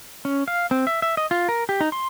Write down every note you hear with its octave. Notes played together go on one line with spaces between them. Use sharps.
C#4
F5
C4
E5
E5
D#5
F4
A#4
G4
D#4
C6